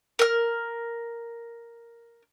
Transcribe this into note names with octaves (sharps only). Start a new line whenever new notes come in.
A#4 F6